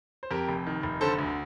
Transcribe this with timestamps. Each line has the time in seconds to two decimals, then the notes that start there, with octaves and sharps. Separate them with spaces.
0.23 C5
0.31 F2 G4 A#4
0.49 F1
0.67 D#3
0.83 F1
1.01 D3 A4 C5
1.19 D2